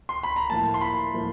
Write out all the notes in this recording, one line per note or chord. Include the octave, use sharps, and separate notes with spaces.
C6
B5
A#5
A2 F3 A#3 A5
C6
B5
A2 F3 A#3